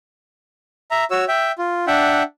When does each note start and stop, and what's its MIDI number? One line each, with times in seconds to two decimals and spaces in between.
0.91 1.05 76
0.91 1.05 82
1.11 1.25 66
1.11 1.25 73
1.11 1.25 88
1.28 1.52 76
1.28 1.52 79
1.58 1.85 65
1.87 2.23 62
1.87 2.23 76
1.87 2.23 78
1.87 2.23 79